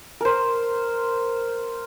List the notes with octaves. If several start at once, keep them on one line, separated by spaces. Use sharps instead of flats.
A#4 C5